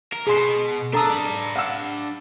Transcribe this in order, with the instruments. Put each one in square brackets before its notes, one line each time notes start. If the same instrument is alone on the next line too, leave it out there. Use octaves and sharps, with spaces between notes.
[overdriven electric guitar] A#4
[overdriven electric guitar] B2 [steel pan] G#4 C6
[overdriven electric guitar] D4 [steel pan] A4 A#5 D#6
[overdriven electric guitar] D4 B5
[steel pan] F5 F#5 E6